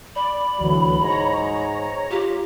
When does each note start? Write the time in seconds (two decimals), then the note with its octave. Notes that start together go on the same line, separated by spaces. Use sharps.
0.16 D5 B5
0.60 D2 E3 F#3
1.01 G#2 C#5 A#5
2.11 F4 G4